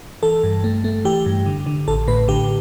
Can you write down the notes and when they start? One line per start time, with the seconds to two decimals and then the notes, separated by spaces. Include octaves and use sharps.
0.23 E3 A4
0.44 G2
0.64 A3
0.84 A3
1.05 E3 G4
1.26 G2
1.46 D3
1.66 D3
1.87 A1 A4
2.08 A2 B4
2.28 D3 G4